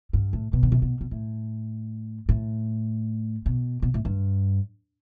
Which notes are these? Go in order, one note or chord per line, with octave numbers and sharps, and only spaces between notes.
G2
A2
B2
D3
C3
B2
B2
A2
A2
B2
B2
A2
G2